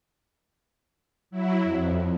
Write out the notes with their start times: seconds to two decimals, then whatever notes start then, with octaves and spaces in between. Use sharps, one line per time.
1.31 F#3 E4
1.64 F2